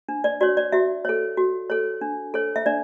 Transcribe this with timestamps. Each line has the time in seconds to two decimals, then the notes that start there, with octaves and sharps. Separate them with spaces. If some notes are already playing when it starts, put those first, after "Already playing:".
0.09 D4
0.24 D5
0.41 F#4 C#5 D5
0.57 D5
0.72 F#4 E5
1.05 A4 C#5
1.37 F#4
1.70 A4 C#5
2.01 D4
2.34 A4 C#5
2.56 E5
2.66 D4 D5